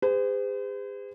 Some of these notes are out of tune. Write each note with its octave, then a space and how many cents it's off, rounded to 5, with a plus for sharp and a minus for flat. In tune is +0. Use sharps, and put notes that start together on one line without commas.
G#4 -45 C5 -45